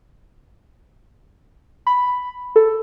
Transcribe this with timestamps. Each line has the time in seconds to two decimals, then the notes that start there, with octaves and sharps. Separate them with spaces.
1.87 B5
2.56 A4